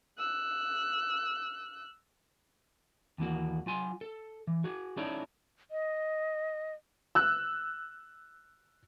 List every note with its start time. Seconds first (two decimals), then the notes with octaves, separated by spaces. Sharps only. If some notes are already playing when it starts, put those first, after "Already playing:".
0.19 E6 F#6
3.18 D#2 E3 A#3 F#4
3.66 F#3 F4 G#5 C6
4.01 A4
4.47 E3
4.64 F#4 G#4
4.97 C#4 D#4 E4 A4 C#5 D5
5.71 D#5
7.15 E6 F#6